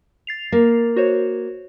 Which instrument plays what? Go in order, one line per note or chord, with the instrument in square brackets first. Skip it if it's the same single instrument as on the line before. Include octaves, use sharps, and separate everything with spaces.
[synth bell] A6 C7 F7
[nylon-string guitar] A#3
[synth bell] F#4 C5 C#5